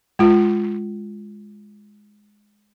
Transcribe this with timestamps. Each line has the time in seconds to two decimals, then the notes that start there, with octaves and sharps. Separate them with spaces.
0.19 G#3 F4